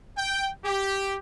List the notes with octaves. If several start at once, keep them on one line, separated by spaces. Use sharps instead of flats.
G5
G4